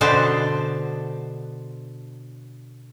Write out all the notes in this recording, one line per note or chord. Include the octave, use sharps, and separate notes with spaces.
B2 D3 B3 C5 A5